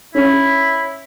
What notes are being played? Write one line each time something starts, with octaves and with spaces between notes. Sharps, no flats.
C#4 E4